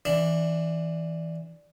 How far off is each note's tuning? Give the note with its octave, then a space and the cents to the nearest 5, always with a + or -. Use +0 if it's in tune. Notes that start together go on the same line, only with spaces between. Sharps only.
E3 -10 D4 +0